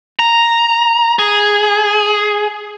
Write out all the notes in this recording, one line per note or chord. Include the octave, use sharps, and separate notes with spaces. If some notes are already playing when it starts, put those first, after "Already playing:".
A#5
G#4